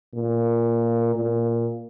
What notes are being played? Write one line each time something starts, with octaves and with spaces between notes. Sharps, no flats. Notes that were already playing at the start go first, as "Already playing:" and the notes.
A#2
A#2